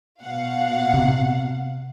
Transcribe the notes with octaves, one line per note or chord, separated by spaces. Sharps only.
B2 F5 F#5
C3